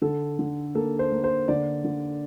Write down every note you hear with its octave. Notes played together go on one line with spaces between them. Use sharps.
D3 A4
D3
A#3 A4
C5
A#3
C5
D3 D5
D3